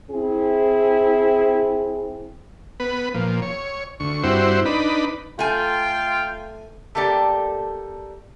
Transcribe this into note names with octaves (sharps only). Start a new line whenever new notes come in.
C4 E4 G#4
B3 B4
A#2 F3
C#5
D2 C#6
G2 C4 E4 F#4 C5
D4 D#4 B4 B5
A3 F4 F5 G5 G#5
A3 A#3 G4 A4 D5